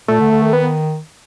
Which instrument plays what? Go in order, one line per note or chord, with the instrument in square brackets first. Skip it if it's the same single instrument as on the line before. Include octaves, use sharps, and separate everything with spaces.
[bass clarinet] A#2 [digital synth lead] A3
[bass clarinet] D3
D3
D#3
[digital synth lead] B3